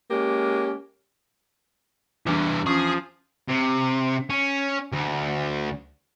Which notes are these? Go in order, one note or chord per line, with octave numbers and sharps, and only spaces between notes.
G#3 A#3 C#4 G4
E2 G2 E3 D4
F3 C#4 G#4
C3
C#4
D2